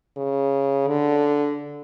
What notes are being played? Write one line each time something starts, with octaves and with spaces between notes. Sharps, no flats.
C#3
D3